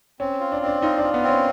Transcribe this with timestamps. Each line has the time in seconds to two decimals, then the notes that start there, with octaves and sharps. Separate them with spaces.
0.20 C4 C#4
0.40 F4
0.52 D4
0.62 C4 D4
0.82 D#4 F4
0.98 D4
1.03 F4
1.14 B3
1.23 C4
1.29 C#4